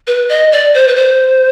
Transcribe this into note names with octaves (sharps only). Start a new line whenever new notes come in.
B4
D#5
D5
C5
B4
C5